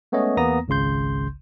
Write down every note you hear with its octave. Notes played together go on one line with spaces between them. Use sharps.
G#3 A3 B3 C#4 C#5 D#5
E2 A#3 B3 A#5 D#6 A#6
G#1 C#2 C#3 C6 G6